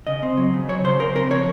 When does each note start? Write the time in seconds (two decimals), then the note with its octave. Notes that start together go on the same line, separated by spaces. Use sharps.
0.07 C#3 D#5
0.23 C4
0.37 F#3
0.54 C#3
0.68 F#3 C#5
0.84 C#3 C5
0.99 C#3 A#4
1.15 C4 A#4
1.30 F3 C#5